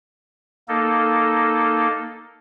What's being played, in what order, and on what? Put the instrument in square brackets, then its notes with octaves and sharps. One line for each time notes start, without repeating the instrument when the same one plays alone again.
[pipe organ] A#3 D#4 A4